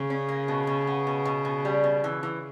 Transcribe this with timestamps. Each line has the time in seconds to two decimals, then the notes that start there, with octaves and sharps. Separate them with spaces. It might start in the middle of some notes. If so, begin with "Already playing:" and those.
Already playing: C#3
0.10 C#4
0.29 A#3
0.48 B2
0.67 B2
0.87 B3
1.07 B2
1.25 B2
1.45 B2
1.65 G3
1.84 B2
2.04 E3
2.23 E3